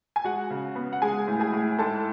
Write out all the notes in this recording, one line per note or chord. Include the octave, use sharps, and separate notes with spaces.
G#5
G#3 F#4 F#5
C#3
B3
F#5
G#3 G#4 G#5
A2
G#4 G#5
A2
G#2 A4 A5